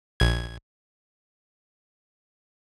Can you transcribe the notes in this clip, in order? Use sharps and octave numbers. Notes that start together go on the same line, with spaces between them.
A#1 G#6